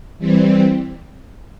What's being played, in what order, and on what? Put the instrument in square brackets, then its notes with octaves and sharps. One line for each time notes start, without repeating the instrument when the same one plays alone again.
[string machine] E3 G3 C4